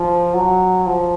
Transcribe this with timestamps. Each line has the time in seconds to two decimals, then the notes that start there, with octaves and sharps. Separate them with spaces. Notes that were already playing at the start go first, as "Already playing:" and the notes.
Already playing: F3
0.34 F#3
0.86 F3